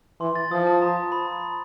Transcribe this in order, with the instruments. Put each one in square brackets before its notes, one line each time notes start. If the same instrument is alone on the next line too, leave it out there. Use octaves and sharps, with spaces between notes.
[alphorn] E3 [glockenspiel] C6
[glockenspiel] A6
[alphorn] F3 [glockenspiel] D#6
[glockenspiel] A5
A#5
A#5
B5